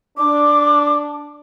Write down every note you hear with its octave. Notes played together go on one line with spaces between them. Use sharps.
D4 D6